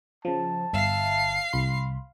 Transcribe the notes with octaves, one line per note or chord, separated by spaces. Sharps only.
C#3 F3 A5
G1 E5 F5 E6 C7
C2 B5 C6